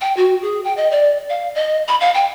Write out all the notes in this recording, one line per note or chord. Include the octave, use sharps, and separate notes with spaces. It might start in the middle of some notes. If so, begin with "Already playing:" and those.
G5
F#4
G#4
G5
D#5
D5
F5
D#5
B5
F5
G5